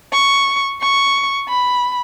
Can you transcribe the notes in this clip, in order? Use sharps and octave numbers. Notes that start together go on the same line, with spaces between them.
C#6
C#6
B5